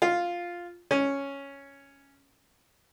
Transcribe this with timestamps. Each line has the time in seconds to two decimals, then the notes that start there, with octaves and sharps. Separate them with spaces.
0.02 F4
0.91 C#4